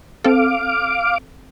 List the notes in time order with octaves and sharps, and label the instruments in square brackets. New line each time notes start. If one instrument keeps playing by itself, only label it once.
[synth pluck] C4 A4 [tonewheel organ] F5 D6